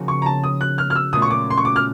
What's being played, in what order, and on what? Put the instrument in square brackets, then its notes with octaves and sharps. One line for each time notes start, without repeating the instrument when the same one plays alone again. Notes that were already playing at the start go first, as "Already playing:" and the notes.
Already playing: [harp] C#3 F3 A#3 D#4 F#4
[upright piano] C#6
A#5
A5
D#6
F#6
F6
F6
E6
[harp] A#2 F#3 A3 C#4 F4 [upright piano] D#6
[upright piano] C#6
D6
C6
C#6
D6
F6